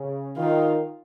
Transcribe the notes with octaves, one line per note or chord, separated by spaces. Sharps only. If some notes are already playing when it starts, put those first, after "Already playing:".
Already playing: C#3
D#3 F4